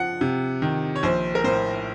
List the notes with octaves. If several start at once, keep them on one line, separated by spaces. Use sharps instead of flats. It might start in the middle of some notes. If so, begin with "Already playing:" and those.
Already playing: F3 F#5
C3
D#3
C#5
A#1 C5
A#4
A2 C5